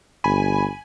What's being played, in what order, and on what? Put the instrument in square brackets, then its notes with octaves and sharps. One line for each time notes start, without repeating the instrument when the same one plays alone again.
[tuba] G1 [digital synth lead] G#5 [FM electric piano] B5